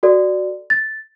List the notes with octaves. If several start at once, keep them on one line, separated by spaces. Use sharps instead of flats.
F#4 A4 D5
A6